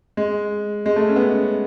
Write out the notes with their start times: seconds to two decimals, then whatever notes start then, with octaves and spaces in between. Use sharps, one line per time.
0.17 G#3
0.86 G#3
0.96 A3
1.08 C#4
1.16 B3